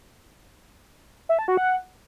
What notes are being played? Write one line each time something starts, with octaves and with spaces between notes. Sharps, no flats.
E5
A5
F#4
F#5